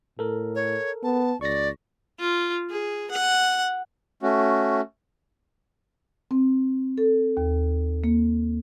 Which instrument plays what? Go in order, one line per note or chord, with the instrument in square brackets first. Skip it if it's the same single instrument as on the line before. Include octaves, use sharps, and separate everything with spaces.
[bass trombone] A2 [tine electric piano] A4 A#4
[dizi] C#5
[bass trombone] B3 [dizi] A5
[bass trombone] C#2 [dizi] D5 [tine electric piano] C#6 A#6
[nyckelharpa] F4
G#4
F#5
[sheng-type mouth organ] A3 C#4 F#4
[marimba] C4
A4
D#2
A#3